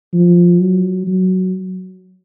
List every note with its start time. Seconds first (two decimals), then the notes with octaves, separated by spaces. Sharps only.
0.13 F3
0.60 F#3
1.07 F#3